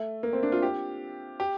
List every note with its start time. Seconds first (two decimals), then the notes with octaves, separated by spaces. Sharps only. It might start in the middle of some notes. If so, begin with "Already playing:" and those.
Already playing: A3
0.23 A#3
0.33 C4
0.43 D4
0.52 F4
0.62 G4
1.40 G4